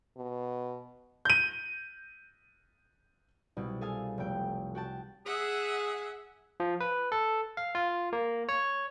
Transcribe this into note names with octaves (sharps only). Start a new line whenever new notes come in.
B2
G6 D#7
C2 B2
G#4 A4 F5 G#5
F1 C3 A3 G5
F#4 G5 A5
G#4 E5 F#5
F3
B4
A4
F5
F4
A#3
C#5